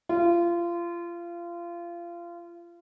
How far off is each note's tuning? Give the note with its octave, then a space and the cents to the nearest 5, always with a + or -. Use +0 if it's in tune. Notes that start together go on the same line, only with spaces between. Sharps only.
F4 -25